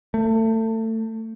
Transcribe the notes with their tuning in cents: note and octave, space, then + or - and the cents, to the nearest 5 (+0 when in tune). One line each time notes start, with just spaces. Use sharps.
A3 +25